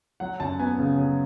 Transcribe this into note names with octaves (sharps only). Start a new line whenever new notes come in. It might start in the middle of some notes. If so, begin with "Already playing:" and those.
F#3 F#5
F#2 A5
B3 G#5
C#3
F#3